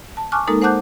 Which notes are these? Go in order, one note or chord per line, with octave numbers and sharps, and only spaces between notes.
A5
G#5 A5 C#6 D6 F6 F#6
G#3 A#3 D#4 A4 A#4
C5 F#5 A5 D6 F#6 G6